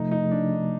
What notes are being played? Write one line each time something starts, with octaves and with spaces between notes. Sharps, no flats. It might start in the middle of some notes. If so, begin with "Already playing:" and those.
Already playing: C3 F3 A3 D#4
D#4
D4